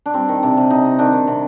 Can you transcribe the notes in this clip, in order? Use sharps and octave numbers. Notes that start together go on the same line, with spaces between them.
D4
G3 C4
D#3
C3 D4
C3
C3 D#4
C3
D#3 D4
D#3
C3